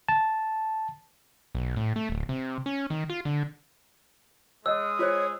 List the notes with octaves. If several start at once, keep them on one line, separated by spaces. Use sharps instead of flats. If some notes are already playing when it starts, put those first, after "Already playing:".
A5
B1
A2
A3
D1
C3
C#4
D#3
F4
D3
G#3 C#5 D#5 D#6 E6
F4 C5 C#5